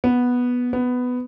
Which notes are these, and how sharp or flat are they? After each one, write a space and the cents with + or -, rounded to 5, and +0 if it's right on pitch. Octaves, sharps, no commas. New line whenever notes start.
B3 -5
B3 +10